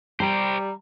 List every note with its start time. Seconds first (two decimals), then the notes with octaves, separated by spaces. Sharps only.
0.20 G3 C5 D5 A#5